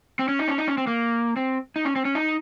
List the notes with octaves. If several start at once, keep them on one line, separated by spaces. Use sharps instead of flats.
C4
C#4
D#4
C#4
D#4
C#4
C4
A#3
C4
D#4
C#4
C4
C#4
D#4